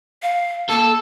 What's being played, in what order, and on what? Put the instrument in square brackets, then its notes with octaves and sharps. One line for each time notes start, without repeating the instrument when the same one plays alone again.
[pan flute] F5
[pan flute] A#3 [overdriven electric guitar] A4